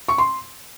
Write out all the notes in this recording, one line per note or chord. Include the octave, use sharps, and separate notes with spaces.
C#6
C6